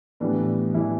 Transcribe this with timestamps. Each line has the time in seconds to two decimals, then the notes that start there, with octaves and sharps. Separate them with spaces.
0.20 A2 E3 G3 B3 D4
0.74 E3 E4